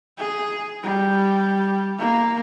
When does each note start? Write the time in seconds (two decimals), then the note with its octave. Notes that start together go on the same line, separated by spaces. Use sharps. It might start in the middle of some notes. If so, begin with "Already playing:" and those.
0.18 G#4
0.83 G3
1.98 A#3